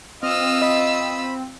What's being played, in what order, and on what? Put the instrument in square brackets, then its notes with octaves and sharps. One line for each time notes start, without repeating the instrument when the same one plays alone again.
[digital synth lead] C4 [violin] F4 E6 [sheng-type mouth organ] D#5 F6
[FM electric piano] D#5 [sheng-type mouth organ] B5